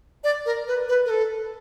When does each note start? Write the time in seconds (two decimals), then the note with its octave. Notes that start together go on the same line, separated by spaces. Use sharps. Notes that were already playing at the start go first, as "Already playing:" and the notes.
0.24 D5
0.46 A#4
0.67 B4
0.89 B4
1.06 A#4
1.10 A4